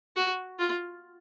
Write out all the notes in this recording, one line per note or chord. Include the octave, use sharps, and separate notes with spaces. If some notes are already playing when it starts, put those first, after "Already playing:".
F#4
F4